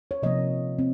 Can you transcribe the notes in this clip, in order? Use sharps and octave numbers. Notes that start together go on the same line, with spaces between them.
C#5
C3 F3 A#3 D#5
C4